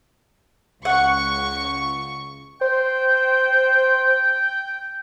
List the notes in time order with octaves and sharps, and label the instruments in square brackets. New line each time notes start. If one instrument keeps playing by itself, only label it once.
[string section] C#2 C#6 [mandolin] F#5
[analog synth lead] C5 [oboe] G5